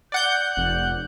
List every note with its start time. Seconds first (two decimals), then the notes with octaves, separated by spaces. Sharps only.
0.12 D5 F#5 F#6 G6
0.57 F1